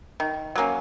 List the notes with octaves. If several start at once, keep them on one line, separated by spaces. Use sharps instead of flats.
D#3
F#3 A#3 C#4